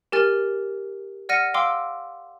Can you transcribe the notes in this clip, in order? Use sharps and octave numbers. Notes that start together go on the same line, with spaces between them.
G4 A#4 G#5 F6 A6
D5 F#5 F6 A#6 C#7 D#7
F5 G5 C6 D6 E6